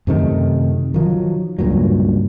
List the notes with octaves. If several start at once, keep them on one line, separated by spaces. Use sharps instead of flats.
F#2 C3 D#3 A3
D#3 F3 F#3
C#2 G2 A#2 F#3